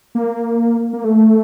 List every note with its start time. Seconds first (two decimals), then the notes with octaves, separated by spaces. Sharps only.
0.15 A#3
0.93 A#3
1.04 A3